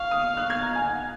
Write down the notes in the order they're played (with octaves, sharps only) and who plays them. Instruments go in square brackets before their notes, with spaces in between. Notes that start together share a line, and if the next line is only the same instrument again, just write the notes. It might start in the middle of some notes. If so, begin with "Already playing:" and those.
Already playing: [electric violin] F5 [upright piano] C#6
[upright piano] D#6
F#6
G#6
A#5
G#5
F#5